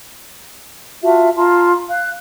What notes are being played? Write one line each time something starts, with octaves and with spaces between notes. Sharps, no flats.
F4 F#4 E5 A5
F4 A5 A#5 C6
F5 F#6